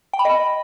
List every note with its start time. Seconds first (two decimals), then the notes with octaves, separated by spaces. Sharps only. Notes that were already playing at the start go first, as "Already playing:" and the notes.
0.13 G5
0.19 B5
0.25 D#5